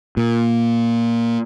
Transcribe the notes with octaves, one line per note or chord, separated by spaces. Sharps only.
A#2